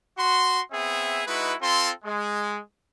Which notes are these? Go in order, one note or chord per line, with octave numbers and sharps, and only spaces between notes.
F#4 C6
B3 C4 G#4 E5
G#3 D#4 E4 F#4 B4
C4 F4 A4 C6
G#3